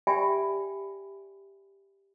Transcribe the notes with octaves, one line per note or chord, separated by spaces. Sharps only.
G4 D5 E5 G5 G#5 B5